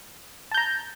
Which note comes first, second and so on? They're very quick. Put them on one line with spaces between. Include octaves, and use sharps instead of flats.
A5 G6 A#5